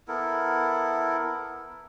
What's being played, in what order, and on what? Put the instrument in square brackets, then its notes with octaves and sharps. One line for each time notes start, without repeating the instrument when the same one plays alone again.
[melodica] B3 E4 A4 A#4